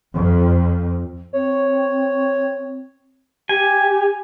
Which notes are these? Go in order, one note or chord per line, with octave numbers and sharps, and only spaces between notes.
F2
C4 C#5
G4 G#5